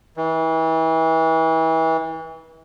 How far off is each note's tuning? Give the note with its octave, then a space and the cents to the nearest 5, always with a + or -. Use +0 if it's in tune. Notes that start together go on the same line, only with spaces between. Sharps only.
E3 -30